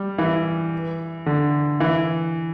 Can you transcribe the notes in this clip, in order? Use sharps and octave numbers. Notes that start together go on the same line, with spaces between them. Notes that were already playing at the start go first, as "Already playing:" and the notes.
Already playing: G3
E3
D3
E3